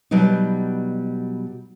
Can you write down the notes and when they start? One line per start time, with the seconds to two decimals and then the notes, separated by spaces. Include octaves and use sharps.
0.11 B2 F#3 G3 B3 D#4